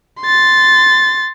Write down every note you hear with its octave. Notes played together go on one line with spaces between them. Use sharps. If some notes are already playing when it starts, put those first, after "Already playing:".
C6 A6